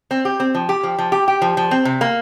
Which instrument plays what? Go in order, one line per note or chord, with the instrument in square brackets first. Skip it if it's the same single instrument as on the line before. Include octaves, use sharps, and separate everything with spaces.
[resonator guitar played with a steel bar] C4
G4
C4
F3
G4
F3
F3
G4
G4
F3
F3
C4
C3
A#3